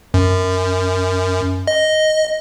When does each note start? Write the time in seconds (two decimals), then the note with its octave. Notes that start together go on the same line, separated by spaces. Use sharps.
0.14 F#2
1.67 D#5